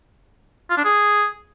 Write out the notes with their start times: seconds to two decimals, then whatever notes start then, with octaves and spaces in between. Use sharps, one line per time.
0.70 F4
0.77 D4
0.85 G#4